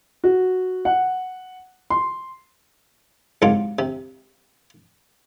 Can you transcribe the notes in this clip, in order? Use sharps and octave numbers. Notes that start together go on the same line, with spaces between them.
F#4
F#5
C6
C2 G#2 F#3 F4 D6
C3